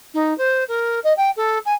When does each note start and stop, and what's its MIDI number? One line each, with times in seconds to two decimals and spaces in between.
0.14 0.36 63
0.38 0.64 72
0.68 1.00 70
1.04 1.13 75
1.17 1.30 79
1.36 1.58 69
1.65 1.74 80